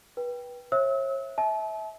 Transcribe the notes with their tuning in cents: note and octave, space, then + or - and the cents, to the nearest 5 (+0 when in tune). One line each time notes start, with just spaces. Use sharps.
B4 -25 G5 +0
C#5 -40 E5 +0 E6 -40
E5 -25 A5 -40